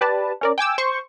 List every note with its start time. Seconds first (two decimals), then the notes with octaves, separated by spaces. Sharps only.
0.01 G4 B4 D5 A5
0.41 C#4 A#4 D5
0.58 G5 G#5 D6 E6
0.78 C5 C6 C#6